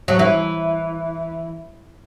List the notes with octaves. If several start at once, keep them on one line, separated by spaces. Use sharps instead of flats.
F#3
E3